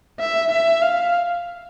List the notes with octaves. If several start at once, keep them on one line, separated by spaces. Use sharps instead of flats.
E5
E5
F5